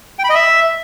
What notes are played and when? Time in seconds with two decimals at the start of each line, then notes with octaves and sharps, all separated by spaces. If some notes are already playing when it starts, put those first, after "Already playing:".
0.19 G5
0.24 B5
0.29 D#5
0.35 E5